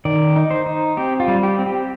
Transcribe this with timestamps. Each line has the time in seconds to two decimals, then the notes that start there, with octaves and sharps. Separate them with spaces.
0.05 D#3 D5
0.36 D#4
0.51 C5
0.66 D#4
0.97 C4 G4
1.20 F4
1.28 G3
1.43 G4
1.58 C4
1.66 G4